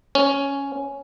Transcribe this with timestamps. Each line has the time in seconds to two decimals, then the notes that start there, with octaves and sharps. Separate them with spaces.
0.15 C#4